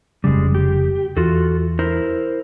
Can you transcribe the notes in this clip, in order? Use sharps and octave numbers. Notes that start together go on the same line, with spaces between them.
F1 C#3 G3 G#3
G4
E2 F4 F#4 A4
E4 A#4 C5